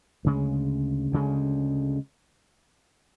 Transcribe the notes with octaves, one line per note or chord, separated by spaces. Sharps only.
D2 C#3 G#3
D2 C#3 G#3